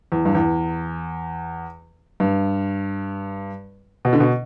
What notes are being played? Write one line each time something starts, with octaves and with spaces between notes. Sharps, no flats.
E2
G2
E2
G2
B2
D3
B2